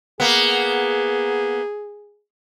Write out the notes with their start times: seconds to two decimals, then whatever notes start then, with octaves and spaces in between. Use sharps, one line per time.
0.20 A#3 B3 G#4